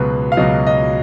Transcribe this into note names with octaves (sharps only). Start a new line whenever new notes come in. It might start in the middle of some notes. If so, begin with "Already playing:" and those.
Already playing: C#2 B2 F#3 B4
F5
C#2 B2 F#3 D#5
D#5